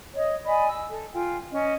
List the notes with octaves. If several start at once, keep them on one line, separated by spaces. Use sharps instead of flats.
C#5 D#5
D5 D#5 G#5 B5
E6
A4
F4 G5 G#5
C#4 D#5